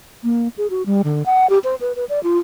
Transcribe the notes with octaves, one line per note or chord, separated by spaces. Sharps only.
A#3
G#4
F#4
G3
D3
F#5
G4
C5
B4
B4
D5
F4